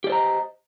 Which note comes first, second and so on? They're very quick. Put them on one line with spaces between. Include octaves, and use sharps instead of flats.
G4 D5 C5 A#5 D#5